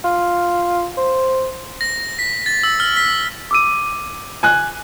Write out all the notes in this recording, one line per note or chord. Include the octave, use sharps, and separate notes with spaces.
F4
C5
A#6
B6
A6
E6
F6
B6
D6 E6 D#7
G#5 F#6